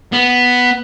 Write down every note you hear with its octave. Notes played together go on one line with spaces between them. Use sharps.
B3